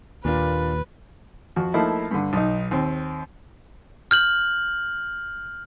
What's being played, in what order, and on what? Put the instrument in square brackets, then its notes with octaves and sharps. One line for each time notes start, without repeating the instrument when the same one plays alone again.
[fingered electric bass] D#2 [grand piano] A#2 D4 F4 [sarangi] B4
[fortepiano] F2 F#4
F3 A3 A#3 D#4 E4
G2 D3
B1 D#4
D#2 C4
[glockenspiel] F6 G6 F#7